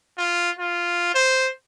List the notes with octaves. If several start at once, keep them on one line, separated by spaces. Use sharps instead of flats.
F4
F4
C5